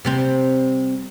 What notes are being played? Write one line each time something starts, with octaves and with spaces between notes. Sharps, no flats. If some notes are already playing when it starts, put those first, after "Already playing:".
C3 G3 C4